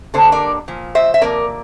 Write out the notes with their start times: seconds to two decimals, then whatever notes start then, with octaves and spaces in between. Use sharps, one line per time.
0.14 D3 G3 A#3 D4 A4 C5
0.32 A#4 D5
0.68 A#2 F3
0.95 C5 E5
1.14 E5
1.21 C3 F3 A#3 A#4 D5